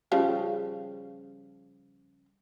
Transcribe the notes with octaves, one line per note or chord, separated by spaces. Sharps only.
C#3 F3 G3